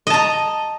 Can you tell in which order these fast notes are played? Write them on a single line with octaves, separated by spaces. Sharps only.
D#5 A5 A#5